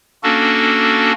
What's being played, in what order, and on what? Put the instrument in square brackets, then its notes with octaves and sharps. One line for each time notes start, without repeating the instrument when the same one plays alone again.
[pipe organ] A#3 C#4 D4 F#4 A4